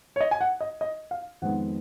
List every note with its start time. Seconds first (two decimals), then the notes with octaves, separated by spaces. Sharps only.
0.16 C#5
0.21 D#5
0.31 G#5
0.41 F#5
0.61 D#5
0.81 D#5
1.11 F5
1.42 F2 D#3 G#3 B3 F#5